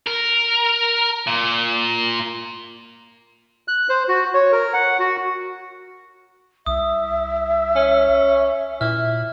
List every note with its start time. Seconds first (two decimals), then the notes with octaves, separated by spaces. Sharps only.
0.07 A#4
1.27 A#2
3.68 F#6
3.89 C5
4.08 F#4
4.34 C#5
4.52 A#4
4.73 F#5
4.99 F#4
6.66 C2 E5 D#6
7.76 C#4
8.81 A#2 E4 F6